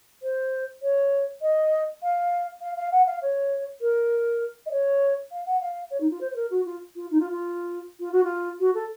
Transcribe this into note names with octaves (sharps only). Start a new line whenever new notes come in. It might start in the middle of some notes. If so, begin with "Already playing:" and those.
C5
C#5
D#5
F5
F5
F5
F#5
F5
C#5
A#4
D#5
C#5
F5
F#5
F5
C#5
D#4
F4
C5
C5
A#4
F#4
F4
F4
D#4
F4
F4
F4
F#4
F4
F#4
A4